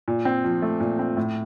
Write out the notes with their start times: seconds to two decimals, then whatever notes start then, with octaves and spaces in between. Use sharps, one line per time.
0.08 A#2
0.25 C4
0.44 F3
0.62 A3
0.80 A#2
0.99 C4
1.17 A2